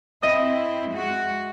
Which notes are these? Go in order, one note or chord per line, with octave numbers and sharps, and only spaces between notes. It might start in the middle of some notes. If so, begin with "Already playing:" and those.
C4 E4 D#5 E5 D#6
G#3 F#4